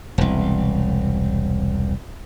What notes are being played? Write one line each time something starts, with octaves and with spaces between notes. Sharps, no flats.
E1 C2